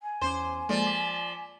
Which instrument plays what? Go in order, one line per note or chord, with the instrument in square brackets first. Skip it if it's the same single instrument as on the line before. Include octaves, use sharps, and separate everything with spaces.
[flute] G#5
[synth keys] E2 C#4 D6 [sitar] C5
[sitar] F3 D5 [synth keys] G#3 A#3 A4
[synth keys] D6 B6 E7